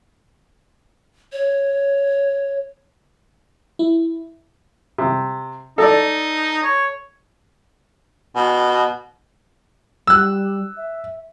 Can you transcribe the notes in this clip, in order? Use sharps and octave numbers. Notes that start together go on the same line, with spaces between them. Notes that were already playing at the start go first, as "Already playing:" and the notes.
C#5
E4
C3
D#4 A4 D5
C#5
B2
G3 E6 F#6
E5